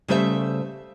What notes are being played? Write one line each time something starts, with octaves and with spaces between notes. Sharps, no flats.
C#3 G3 A3 C5 D5 E5